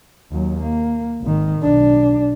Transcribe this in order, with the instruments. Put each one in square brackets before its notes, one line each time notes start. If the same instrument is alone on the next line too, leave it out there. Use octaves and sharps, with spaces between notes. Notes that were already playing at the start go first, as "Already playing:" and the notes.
[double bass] D#2 F#3
A#3
G#1 D#3
B1 D4